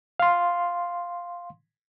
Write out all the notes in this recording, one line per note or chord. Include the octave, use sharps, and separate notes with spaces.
F5 C6